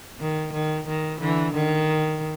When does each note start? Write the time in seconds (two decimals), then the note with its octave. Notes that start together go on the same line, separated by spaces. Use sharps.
0.20 D#3
0.53 D#3
0.87 D#3
1.20 D3 E3
1.54 D#3